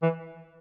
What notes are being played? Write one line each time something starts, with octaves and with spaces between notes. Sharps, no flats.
E3